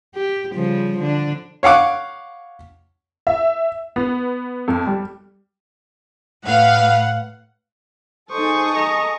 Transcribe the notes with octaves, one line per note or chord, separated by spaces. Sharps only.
G4
C#3 F3 G3
D3 D4
C#5 F5 F#5 D6
E5
B3
F2
G3
A2 B4 F5 F#5
D#4 G#4 A4 C5 C#6 D#6
D#5 A#5